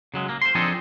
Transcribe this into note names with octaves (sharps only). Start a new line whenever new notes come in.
C#3 F#3 G#3
A#3
C5 C6
F3 C4 D4 D#4 G#4 A4